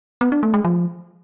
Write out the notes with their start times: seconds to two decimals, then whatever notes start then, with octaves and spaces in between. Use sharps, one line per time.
0.21 B3
0.32 D4
0.43 A3
0.54 G#3
0.65 F3